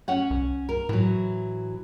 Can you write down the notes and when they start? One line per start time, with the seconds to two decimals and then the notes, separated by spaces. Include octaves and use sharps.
0.08 C#4 C#5 F#5
0.30 C2
0.69 A#4
0.89 A2 E3 F#3